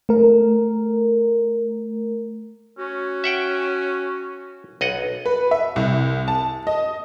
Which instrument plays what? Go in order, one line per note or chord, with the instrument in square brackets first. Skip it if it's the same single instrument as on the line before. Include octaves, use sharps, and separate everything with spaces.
[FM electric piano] A3 A#4
[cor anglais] C#4 [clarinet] F#4
[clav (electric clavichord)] E5 F#5 G5
B1 D#5 F#5
[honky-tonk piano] B4
E5
C2
A5
D#5